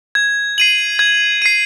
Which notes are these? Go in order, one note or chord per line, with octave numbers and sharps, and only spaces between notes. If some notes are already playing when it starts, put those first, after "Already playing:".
G#6
C7 D#7 F#7
G#6
C7 D#7